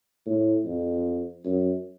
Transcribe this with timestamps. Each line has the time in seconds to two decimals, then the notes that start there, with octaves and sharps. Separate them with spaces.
0.26 A2
0.65 F2
1.45 F#2